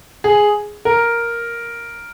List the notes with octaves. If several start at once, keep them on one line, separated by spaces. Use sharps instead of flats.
G#4
A#4